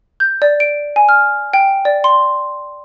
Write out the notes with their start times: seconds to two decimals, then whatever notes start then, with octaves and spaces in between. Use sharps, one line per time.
0.20 G6
0.42 D5
0.60 D7
0.96 G#5
1.09 F6
1.54 G5
1.85 D5
2.04 C6